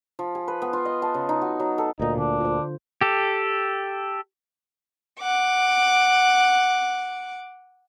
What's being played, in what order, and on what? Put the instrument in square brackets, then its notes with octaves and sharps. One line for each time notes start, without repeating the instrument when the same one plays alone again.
[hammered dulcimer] F3
G#4
B4
B3
F4
D#5
A5
C#3
D#4
F#4
F#3
A4
[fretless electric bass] D2 A#2 [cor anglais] D#4
[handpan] D3 [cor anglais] D4
[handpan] F4 C5
[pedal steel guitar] G4 A4
[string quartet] F#5 D6